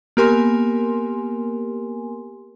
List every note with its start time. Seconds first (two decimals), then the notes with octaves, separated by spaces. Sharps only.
0.17 A#3 B3 G4 A#4 G#5 C6